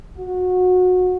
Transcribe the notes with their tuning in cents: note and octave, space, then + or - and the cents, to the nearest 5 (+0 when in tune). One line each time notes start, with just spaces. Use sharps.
F#4 -20